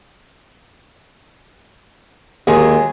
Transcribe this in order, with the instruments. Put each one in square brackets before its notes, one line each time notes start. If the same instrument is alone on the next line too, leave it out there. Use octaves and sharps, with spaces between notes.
[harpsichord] D#2 [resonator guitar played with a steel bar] F#3 G#3 G#4